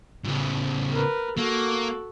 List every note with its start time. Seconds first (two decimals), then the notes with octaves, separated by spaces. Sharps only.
0.25 A2 C#3
0.94 A#4 B4
1.37 A#3 F#4 A4